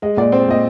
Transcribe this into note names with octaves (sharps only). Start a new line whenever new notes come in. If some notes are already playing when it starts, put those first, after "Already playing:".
G#3 D#5
A#2 D5
C4 C5
A#2 D#5